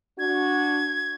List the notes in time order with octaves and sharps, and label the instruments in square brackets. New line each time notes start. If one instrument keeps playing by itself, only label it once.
[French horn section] D4 F#4 [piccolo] G#6